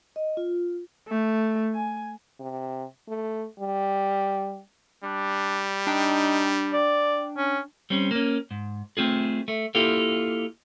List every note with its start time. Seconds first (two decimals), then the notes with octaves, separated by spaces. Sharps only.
0.16 D#5
0.37 F4
1.08 A3
1.74 G#5
2.40 C3
3.08 A3
3.59 G3
5.04 G3 D4
5.87 D4 D#4 G5
6.73 D5
7.37 C#4
7.90 G3 C4 C#4
8.11 A#3 C#4
8.51 G#2
8.97 A3 C4 F4 G#4
9.48 A3
9.75 A#3 E4 F4 G4 A4